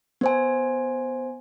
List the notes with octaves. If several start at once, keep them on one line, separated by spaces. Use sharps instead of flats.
B3 C5 G#5